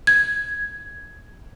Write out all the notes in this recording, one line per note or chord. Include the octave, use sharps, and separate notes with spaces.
G#6